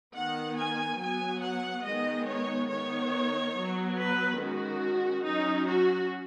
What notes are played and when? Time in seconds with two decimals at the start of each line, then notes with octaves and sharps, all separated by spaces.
0.14 D#3 B3 F#5
0.57 G#5
0.98 F#3 B3 G#5
1.41 F#5
1.84 D#3 G#3 B3 D#5
2.27 C#5
2.69 D#3 B3 C#5
3.54 F#3 B3
3.97 B4
4.39 D#3 G#3 C#4 F#4
5.24 F#3 C#4 D#4
5.67 F#4